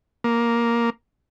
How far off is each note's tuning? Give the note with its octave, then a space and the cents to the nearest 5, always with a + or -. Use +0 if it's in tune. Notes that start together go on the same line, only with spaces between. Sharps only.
A#3 +5